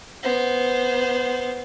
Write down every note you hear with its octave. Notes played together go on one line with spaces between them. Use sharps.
B3 C5